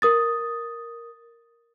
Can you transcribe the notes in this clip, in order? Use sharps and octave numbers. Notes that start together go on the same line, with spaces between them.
A#4 D#6 A6